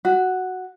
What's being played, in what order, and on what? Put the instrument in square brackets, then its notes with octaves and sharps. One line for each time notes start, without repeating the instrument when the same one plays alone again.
[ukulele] F#4